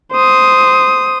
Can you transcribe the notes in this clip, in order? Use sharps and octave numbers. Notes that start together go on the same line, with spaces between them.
C5 D#6